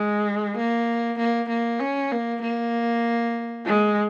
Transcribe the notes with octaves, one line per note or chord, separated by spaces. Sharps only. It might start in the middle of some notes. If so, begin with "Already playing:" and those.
Already playing: G#3
A#3
A#3
A#3
C#4
A#3
A#3
G#3